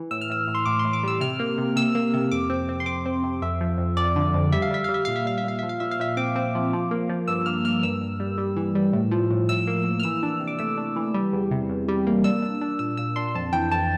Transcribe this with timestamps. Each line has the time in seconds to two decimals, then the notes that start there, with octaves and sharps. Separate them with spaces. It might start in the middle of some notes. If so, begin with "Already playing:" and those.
Already playing: E3
0.11 A2 E6
0.21 F6
0.30 A2 E6
0.48 A2
0.55 C6
0.65 A2 D6
0.79 C6
0.85 A2
0.93 D6
1.03 G3 E6
1.21 C3 F6
1.39 A#3
1.58 C3
1.76 C3 E6
1.95 A#3
2.14 C3
2.31 F2 D6
2.50 C4
2.69 C4
2.80 C6
2.86 C4 D6
3.06 C4
3.24 C3
3.42 F2 E5
3.61 F3
3.78 F2
3.97 F2 D5
4.16 D3
4.34 F2
4.52 G3 E5
4.62 F5
4.71 G3 E5
4.84 G3 F5
4.94 E5
5.05 A#2 F5
5.16 E5
5.26 G3 F5
5.38 E5
5.44 A#2 F5
5.59 F3 E5
5.69 F5
5.80 A#2 E5
5.91 F5
5.99 A#2 E5
6.17 C4 D6
6.36 C4
6.55 F3
6.73 F3
6.91 A#3
7.09 F3
7.28 G2 E6
7.46 A#3 F6
7.65 A#3 F6
7.83 G2 E6
8.01 G2
8.20 G3
8.38 G3
8.57 E3
8.75 G3
8.93 A2
9.11 F3
9.30 A2
9.49 A2 E6
9.67 A#3
9.85 A#3
10.00 F6
10.03 E3 E6
10.23 D4
10.40 C3
10.47 D6
10.59 A3 E6
10.77 D4
10.96 E3
11.14 G3
11.33 E2
11.51 C3
11.69 E2
11.88 G3
12.07 A#3
12.24 D4 E6
12.42 D4
12.61 D4
12.79 A#2 E6
12.97 A#2 E6
13.16 D4 C6
13.35 F2 A5
13.53 E3 G5
13.71 F2 A5